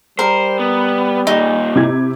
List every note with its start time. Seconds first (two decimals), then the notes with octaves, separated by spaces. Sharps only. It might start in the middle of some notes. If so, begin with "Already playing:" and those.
0.19 G3 A#4 C5
0.59 B3
1.27 D#2 A#2 D#4
1.76 C3 E4 G#6